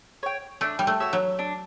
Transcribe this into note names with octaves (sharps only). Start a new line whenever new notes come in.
C#5 G5
A3 D4
G3
A3
F#4 C#5 E5
F#3
D4